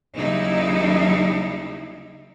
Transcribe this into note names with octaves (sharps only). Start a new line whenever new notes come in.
D#2 C#3 F#3 G3 D#4 E4